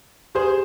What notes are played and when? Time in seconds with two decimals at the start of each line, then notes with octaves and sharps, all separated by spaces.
0.35 G4 G#4 C5